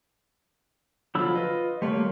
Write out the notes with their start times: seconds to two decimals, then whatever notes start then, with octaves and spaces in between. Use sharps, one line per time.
1.15 D3 F3 F#3 F4 B5 E6
1.35 F4 B4 D#5
1.82 G#1 G3 A3 A#3 C#5 C6